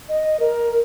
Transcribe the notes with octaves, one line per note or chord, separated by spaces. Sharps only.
D#5
A#4